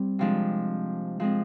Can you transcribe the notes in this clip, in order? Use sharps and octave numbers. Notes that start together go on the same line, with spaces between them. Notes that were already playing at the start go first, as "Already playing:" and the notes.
Already playing: G3 C4
C3 F3 G#3 D4
F3 G#3 C4